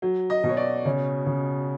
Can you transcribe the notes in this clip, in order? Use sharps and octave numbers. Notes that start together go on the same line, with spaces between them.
F#3
D#5
B2
C#5
D5
C#3 C#5
C#3